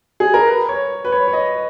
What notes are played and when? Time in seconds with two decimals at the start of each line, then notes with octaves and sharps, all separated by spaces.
0.20 G#4
0.34 A#4
0.47 B4
0.69 C#5
1.05 B4
1.12 C#5
1.28 C#5
1.33 D#5